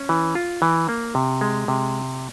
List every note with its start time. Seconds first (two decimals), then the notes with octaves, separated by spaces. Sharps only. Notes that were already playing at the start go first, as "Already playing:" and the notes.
Already playing: C#4
0.09 E3
0.35 F4
0.62 E3
0.89 A#3
1.15 C3
1.41 G#3
1.68 C3